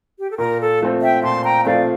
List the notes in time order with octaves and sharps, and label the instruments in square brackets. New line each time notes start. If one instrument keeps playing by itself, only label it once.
[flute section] G4
A4
[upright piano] A#2 [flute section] A#4
[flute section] A4
[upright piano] F3 A3 C4
[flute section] E5 G5
[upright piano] A#2 [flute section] A5 C6
[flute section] G5 A#5
[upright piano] F3 A3 C4 [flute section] D5 F5